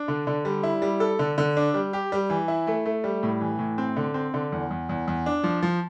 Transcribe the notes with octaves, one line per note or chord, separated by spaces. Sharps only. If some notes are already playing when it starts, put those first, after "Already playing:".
Already playing: D4
D3
D3
G3
E4
G3
A4
D3
D3
D4
G3
G4
G3
E3
E4
A3
A3
G3
A2
E3
A2
C4
D3
C4
D3
E2
E2
E2
E2
D4
F3
F3